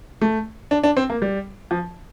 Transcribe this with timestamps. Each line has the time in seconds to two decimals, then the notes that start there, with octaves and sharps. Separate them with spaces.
0.21 A3
0.71 D4
0.84 D4
0.97 C4
1.10 A#3
1.22 G3
1.71 F3